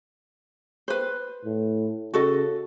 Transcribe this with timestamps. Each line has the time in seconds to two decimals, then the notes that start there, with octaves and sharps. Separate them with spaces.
0.88 B4 C5
1.45 A2
2.14 C#3 F#4 A4 D#5